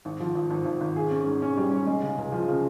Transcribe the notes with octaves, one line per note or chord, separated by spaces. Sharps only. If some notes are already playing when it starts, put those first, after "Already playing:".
G#1
F3
G#1
G#1
G#1
G#1
G#4
C#4
G#2
C#4
G3
C#4
G#3
C#3
C#2
F3
C#3